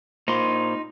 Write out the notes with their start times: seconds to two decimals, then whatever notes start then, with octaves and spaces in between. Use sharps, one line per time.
0.28 A#3 D#4 F4 C5 C6